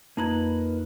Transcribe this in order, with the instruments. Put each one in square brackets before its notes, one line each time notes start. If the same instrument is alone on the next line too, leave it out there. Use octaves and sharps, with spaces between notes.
[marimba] F2 A#5 G#6 [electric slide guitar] A#3 D#4 B4